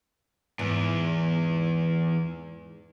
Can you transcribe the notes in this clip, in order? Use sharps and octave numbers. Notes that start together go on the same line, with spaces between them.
E2 G#2